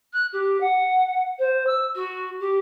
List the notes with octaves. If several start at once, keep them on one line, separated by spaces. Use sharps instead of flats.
F#6
G4
F#5
C5
E6
F#4
G4